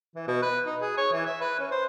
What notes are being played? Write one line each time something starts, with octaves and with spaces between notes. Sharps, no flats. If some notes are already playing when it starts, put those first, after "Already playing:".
E3
B2
B4
D#4
G#4
C#5
E3
E5
B4
C#4
C5